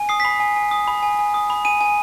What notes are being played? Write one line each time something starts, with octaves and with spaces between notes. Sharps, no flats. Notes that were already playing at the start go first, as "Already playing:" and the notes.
Already playing: G#5
D#6 C7
B6
B5 C7
G#5
G#5
D#6
B5
G#5
G#5
D#6
B5
G#5 D#7
G#5 D#7